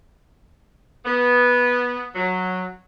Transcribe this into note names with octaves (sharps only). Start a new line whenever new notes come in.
B3
F#3